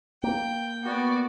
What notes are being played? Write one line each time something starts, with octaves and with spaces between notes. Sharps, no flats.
A#3 G5
B3 F#4 D5